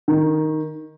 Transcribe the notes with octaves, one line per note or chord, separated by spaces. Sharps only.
D#3